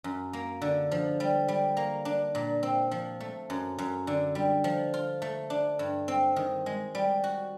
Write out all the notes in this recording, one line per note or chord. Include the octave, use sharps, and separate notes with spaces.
F#2
A#3
D3
F3
G3
G3
A#3
D4
A#2
C4
F3
A3
F#2
F#2
D3
G3
F3
F4
A3
D4
G2
C4
D#3
G#3
G3
F#4